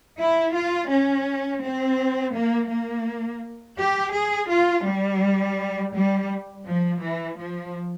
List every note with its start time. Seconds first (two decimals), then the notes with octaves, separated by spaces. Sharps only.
0.19 E4
0.55 F4
0.91 C#4
1.63 C4
2.35 A#3
2.70 A#3
3.79 G4
4.14 G#4
4.50 F4
4.86 G3
5.94 G3
6.66 F3
7.02 E3
7.38 F3